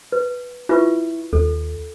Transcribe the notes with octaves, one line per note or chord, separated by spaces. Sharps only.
B4
E4 F4 B4 C#6
D#2 A4